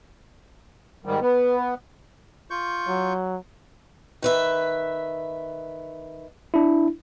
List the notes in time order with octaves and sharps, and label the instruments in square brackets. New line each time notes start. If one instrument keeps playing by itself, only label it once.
[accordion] G#2 D#3 G3
[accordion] B3 [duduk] B4
[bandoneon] F4 C#6 G6
[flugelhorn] F#3
[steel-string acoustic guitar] D#3 B4 E5
[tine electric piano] D4 E4